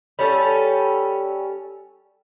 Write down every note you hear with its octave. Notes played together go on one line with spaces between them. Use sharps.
G3 C#4 A4